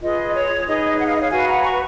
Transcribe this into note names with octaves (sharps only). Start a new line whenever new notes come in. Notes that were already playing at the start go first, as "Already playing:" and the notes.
F4 G#4 B4 D#5
C#5
D#4 G#4 B4 D#5
F#5
F5
D#5
C#5 F5
F#4 B4 F5 G#5
B5
F#5 A#5
A#5 C#6